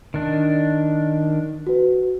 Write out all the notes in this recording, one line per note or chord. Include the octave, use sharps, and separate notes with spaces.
D#3 D4
F#4 B4